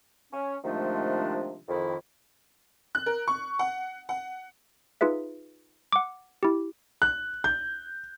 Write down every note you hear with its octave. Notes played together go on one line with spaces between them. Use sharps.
C#4
C3 D#3 F3 G#3 A3 D4
F2 D#3 E4
F#6
A#4
C#6
F#5
F#5
D#4 F4 G#4 B4 E5
F#5 D6
E4 G4
F#6
G6